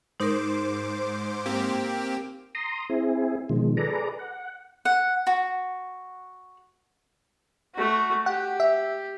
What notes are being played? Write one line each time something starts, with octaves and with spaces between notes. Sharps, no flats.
G#2 D#4 A#4 C5 D6
A#3 C4 G4
A#5 C6 D#6
C4 E4 G#4
B2 D#3 F3 G#3
G#4 A4 B4 D5 A#5
F#5
F#5
F#4
A3 F#4
G4 F#5
E5